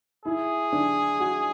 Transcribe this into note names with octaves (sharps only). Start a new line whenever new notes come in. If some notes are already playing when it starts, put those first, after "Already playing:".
E4 G#4
D4
F#4